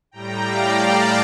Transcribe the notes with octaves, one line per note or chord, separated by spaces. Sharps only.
A2 G3 G5 A#5
D5 F5
F5 A5